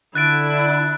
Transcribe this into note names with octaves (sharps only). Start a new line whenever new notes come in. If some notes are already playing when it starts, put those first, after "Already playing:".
D3 D4 E4 F#6 A6 D7